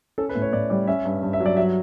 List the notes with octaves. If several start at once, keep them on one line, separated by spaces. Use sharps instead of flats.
C#4 A4
B4
A2
C#5
A2 D5
G3 D5
C#4 E5
G2
G2
E5
F#3
D5
F#3 E5